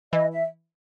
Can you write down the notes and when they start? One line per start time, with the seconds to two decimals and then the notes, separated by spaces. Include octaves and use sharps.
0.13 E3 D#5
0.32 E5